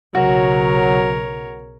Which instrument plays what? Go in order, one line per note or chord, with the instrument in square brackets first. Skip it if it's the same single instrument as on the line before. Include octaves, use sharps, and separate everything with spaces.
[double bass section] B1 C#3 [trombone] F#3 [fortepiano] F#4 [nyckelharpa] A#4 C#5